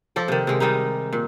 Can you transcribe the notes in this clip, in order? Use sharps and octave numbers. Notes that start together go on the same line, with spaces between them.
F3 A4 D5
C3 D#3
C3 G#3
D#3 G3 G#3 D#4
A#2